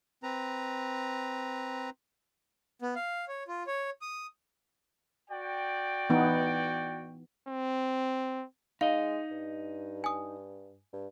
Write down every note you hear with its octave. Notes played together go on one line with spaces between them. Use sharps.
C4 B4 A#5
B3
F5
C#5
F4
C#5
D#6
F#4 D5 G5
E3 B3 D#4
C4
G#3 D#4 D#5 F5
G2
G#5 D#6
G2